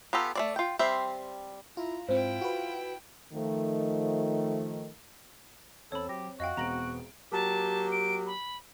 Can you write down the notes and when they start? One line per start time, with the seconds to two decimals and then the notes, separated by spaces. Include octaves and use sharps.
0.13 B3 F4 G4 A4 A#5
0.35 A3 C4 D5
0.56 F4 G5
0.79 G3 C4 C5 E5
1.77 E4 F4 A#5
2.09 G#2 C4 E4 F4 C5 G5
2.41 F#4 B4
3.34 D#3 F3 A3
5.92 E2 C4 A4 C#5 B5
6.09 F#3 G4 A#6
6.40 F2 F#4 D#5 F5 G5
6.57 E1 B3 C4 A#5 A#6 D7 F#7
7.32 F#3 A#3 G4 A5
7.92 D7
8.27 B5